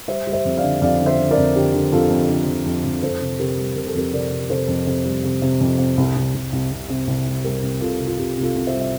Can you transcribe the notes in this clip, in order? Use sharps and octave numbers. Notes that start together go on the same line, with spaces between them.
G3 C5 E5
G3
C5 E5
F2
D5 F5
D3
F2 D5 F5
D3
C5 E5
D3
A#4 D5
F2
D3 G4
D3
F2 F4 A4
F2
D3
F2
F2
F2
F2 A4 C5
C3
C3 G4 A#4
G3
C3 A#4
A4
F2 G4 A#4
C3 A#4 D5
C3
C3 A4 C5
F2
C3
G3
C3
C3
F2
C3
C2
C2
C2
C2
C3
C3
C2
G3
G3 G4 A#4
C2
C3 F4 A4
C3
F4
C2 G4
C3
F4 A4
C2
C5 E5
G3
E5